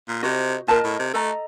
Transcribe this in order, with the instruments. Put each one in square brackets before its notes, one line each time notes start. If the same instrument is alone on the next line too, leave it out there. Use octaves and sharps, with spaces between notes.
[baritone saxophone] A#2
[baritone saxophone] C3 [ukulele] F#4 C5 D#5
[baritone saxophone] A#2 [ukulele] A#4 D#5 A5
[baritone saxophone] A2
C3
[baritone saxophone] A3 [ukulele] A4 D#5 A#5